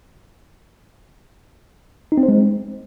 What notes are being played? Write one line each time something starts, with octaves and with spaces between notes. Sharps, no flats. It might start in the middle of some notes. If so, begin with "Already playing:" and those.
D#4
C4
C5
G#3